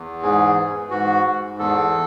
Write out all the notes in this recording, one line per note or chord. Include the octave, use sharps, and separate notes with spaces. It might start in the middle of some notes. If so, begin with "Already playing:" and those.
Already playing: E2
G#2 G#4
E3
G#2 F#4
G#2
E2 A4